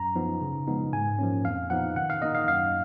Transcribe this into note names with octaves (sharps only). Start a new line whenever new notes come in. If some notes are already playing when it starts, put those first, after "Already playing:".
Already playing: F#2 A#5
F3 B3 D#4
C#3
F3 G#3 B3 D#4
G#2 G#5
F3 A#3 C#4
F2 F5
F3 B3 D#4 F#5
D#3 F#5
F5
A#3 D#4 D#5
F5
F#2 F5